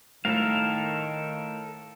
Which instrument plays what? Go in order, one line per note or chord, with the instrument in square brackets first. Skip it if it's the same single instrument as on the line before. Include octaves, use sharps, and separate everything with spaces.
[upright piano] A2 [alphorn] D#3 [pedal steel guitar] A4 A#4 F5